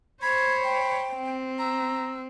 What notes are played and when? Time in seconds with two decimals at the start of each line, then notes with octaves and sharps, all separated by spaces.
0.22 C5 C#5 B5 G#6
0.64 G5
1.13 C4
1.59 A#5 E6